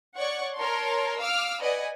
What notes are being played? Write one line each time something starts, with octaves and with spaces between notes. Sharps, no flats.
C#5 D5 F#5 C#6
A#4 C#5 A5 C6
F5 D6 E6 F6
B4 D5 D#5 F#5 G#5